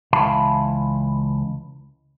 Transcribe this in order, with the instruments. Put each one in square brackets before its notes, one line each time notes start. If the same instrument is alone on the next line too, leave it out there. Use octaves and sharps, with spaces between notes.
[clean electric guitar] C#2 E3 E5 F5 A5 B5